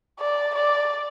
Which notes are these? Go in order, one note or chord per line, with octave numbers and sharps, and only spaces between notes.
D5
D5